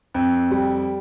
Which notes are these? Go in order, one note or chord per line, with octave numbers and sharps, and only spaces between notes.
F2
G3